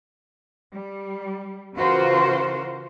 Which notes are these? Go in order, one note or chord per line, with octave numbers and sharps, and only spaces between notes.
G3
C#3 E3 F4 F#4 A#4 C5